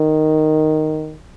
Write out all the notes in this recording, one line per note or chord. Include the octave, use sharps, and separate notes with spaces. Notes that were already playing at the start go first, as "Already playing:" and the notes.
Already playing: D#3